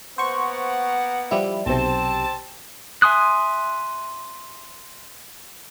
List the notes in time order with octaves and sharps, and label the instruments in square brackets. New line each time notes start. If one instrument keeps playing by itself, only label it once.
[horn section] A#3 B3 F#5 [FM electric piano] C5 C#6
[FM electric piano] F3 G3 E4
[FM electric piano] B1 C3 [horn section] C4 A5
[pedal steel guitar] E5 G#5 C6 D#6 F#6